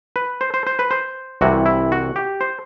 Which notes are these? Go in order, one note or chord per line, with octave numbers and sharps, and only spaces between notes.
B4
C5
C5
C5
B4
C5
C2 C3 E3 F#4
E4
F#4
G4
C5